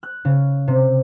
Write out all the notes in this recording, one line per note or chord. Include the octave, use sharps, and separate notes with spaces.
F#6
C#3
C3